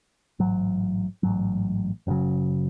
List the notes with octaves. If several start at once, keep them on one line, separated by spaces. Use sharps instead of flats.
A1 G#2 F#3
A1 G#2 F#3
F#1 E2 C#3 F#3